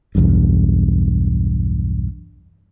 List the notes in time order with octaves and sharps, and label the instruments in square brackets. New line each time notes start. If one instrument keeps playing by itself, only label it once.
[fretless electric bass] B1 E2 G2